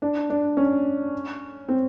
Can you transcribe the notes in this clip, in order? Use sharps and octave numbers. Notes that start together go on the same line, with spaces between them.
D4
D4
C#4
C4